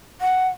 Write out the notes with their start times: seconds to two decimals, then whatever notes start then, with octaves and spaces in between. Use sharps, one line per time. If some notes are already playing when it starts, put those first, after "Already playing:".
0.21 F#5